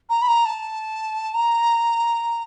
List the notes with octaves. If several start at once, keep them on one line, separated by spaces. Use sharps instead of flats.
A#5
B5
A#5
A5
A#5